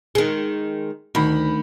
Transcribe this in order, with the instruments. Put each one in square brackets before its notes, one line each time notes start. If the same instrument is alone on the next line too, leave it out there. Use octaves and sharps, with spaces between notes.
[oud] D#3 G#3
[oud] D2 [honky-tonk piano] D#3 B5